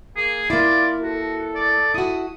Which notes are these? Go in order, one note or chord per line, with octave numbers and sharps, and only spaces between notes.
A#3 G#4
A#3 E4 F4 D5
F#4 A4
D5
E4 F#4 D#6